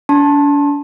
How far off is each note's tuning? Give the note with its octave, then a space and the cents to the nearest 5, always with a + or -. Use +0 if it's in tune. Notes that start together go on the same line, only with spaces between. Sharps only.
D4 -45 A5 +0 C6 +45